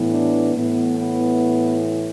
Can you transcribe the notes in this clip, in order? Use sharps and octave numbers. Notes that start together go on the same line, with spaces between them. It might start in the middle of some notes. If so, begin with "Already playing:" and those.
Already playing: A2 E3 B3
D4
A2 E3 B3
B3